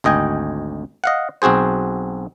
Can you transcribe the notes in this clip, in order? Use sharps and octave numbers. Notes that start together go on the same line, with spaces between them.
G#1 D2 D#5 G5 G#5
D#5 F5 F#5
B1 C4 F#4 G#4 C5